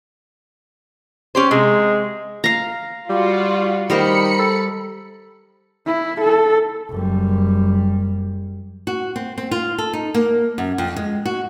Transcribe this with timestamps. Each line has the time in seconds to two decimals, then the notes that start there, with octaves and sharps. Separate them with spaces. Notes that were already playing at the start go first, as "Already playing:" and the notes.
1.35 C#4 G4 C5
1.51 C3 G#3
2.44 F5 A#5
3.09 G3 F4 F#4
3.90 D#3 G3 A#4 C5 B5 C#7
4.39 A4
5.86 E4
6.21 A4
6.91 F#1 G3
8.87 F#4
9.16 C4
9.38 C4
9.51 F4
9.78 A4
9.93 D#4
10.14 A#3
10.58 F#2
10.78 F2
10.96 G#3
11.26 F#4